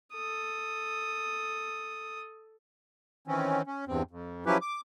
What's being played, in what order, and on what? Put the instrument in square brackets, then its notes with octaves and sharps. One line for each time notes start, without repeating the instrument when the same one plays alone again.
[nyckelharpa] A4 D#6
[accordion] D#3 E3 C4 C#4
C#4
E2 G2 C4
F2
F3 F#3 C#4 E4 G4 B4
D6